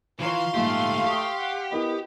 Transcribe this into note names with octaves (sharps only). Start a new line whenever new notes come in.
E3 F4 F5 A#5 C6 C#6
A#1 G#2 A3 G4 A4
G4 C#6 D#6 F6
F#5
B3 E4 A#4 D#5